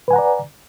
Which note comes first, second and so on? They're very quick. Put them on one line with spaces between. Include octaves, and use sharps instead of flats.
B4 G#5 F#5 A#5 D5